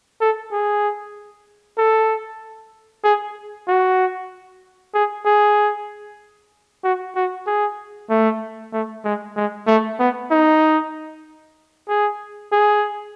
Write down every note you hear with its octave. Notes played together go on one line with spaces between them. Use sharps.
A4
G#4
A4
G#4
F#4
G#4
G#4
F#4
F#4
G#4
A3
A3
G#3
G#3
A3
B3
D#4
G#4
G#4